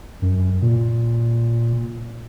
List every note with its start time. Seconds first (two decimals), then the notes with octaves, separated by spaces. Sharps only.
0.22 F#2
0.62 A#2